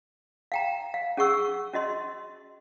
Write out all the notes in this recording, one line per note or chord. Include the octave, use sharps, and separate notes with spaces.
F5 G5 A#5
F5
C#4 G#4 F#5 C#6 E6
C#4 F#4 D#5 C6